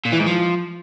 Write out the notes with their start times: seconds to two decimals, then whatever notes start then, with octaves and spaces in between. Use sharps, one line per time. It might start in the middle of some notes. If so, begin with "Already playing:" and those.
0.06 A#2
0.13 E3
0.20 G#2
0.27 F3